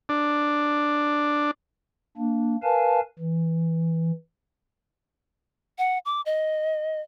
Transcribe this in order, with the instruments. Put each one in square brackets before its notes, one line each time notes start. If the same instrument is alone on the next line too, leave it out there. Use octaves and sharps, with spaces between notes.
[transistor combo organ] D4
[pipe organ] A#3 D4
A#4 B4 F5 G#5 A5
E3
[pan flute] F#5
D6
D#5